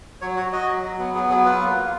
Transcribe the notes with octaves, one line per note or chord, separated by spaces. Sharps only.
F#3 C#5
F#4 C#5
F#4 D#5
F#3
F#3
B3
B3 G#4
F#3 G#4
F4 B4
A#3
F4